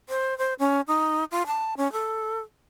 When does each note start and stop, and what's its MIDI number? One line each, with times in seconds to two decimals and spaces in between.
0.09 0.37 72
0.38 0.54 72
0.59 0.81 61
0.88 1.24 63
1.31 1.43 65
1.47 1.74 81
1.77 1.91 61
1.92 2.39 69